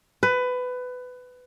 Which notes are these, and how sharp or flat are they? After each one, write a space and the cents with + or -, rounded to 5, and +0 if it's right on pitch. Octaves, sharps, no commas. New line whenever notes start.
B4 +20